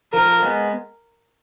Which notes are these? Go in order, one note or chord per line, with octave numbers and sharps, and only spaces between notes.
F3 A#4
G#3 B3